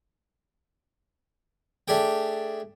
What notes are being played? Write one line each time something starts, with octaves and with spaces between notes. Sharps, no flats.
A3 D4 G4 G#4 G5